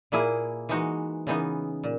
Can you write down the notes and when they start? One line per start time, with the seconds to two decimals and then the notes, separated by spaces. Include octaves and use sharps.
0.12 A#2 A#3 E4 G#4
0.69 E3 G#3 D#4 F#4
1.27 C#3 E3 B3 D#4
1.84 A#2